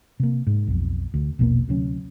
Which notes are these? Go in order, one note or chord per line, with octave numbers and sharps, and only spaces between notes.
C3 A#3
G#2
B1 F2
D2
A#1 E2 B2 A#3
D2 C3 F#3 C#4